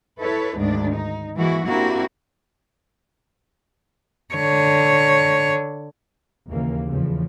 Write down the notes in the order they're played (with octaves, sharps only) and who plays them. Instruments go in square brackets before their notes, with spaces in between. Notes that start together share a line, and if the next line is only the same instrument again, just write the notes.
[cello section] E4 A4 B4 C#5
D2 G#2 D#3 D4
D#4
E3 G#3 A#3 E4 F#4
A#3 C4 D4 E4 F#4 G4
[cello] D3 C#5
[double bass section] D#2 C#3 E3 A#3
E2 A2 C#3 E3 F3